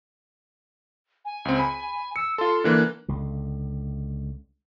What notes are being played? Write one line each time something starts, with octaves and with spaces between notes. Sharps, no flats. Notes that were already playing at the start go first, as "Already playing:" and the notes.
G#5
C#2 C4
B5
E6 C#7
F4 A4 C6
D3 E3 A#3 F#6
C#2 D3